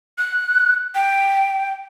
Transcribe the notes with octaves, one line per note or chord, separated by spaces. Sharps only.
F#6
G5